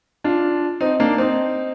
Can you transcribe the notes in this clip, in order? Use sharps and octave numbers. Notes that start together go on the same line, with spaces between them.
D4 F4
C4 D#4
A#3 D4
C4 D#4